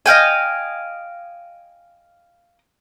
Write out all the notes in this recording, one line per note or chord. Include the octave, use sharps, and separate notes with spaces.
D#5 F5 G5 G#5